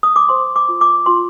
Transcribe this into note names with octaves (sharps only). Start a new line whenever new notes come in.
D#6
D6
C5 C6
D6
F4
D6
F4 C6